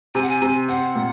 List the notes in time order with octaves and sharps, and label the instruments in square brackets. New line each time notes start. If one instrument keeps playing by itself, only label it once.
[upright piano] C3 [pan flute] G#5
[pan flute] F#5
G#5
[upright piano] C3
[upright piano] C4 [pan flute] F#5
[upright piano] A#2